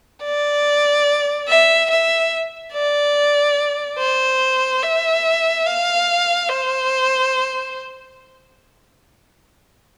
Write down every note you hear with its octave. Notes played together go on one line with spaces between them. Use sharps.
D5
E5
E5
D5
C5
E5
F5
C5